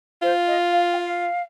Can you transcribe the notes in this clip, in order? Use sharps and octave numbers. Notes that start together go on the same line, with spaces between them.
F4 C5
D#5
F5
G5
F5